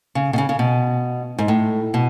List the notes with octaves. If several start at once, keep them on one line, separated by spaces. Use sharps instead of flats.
C#3
B2
C#3
C#3
B2
G#2
A2
B2